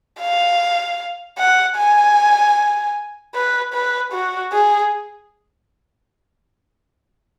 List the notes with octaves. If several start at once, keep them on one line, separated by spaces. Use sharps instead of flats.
F5
F#5
G#5
B4
B4
F#4
G#4